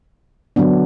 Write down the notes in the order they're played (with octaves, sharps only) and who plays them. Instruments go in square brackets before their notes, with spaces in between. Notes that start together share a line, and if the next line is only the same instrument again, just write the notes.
[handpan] D3 F#3 B3 D4